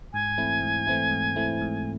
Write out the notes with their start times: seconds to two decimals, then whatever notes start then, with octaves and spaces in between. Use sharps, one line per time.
0.13 G#2 G#5
0.38 E3 A3 C4 E4
0.62 G#2
0.87 E3 A3 C4 E4
1.11 G#2
1.36 E3 A3 C4 E4
1.61 G#2